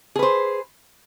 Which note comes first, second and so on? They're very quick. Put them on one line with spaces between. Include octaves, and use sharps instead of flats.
G#4 B4 C5